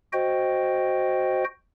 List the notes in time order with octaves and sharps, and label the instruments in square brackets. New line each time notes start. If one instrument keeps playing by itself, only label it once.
[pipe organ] F#4 C5 D#5 G5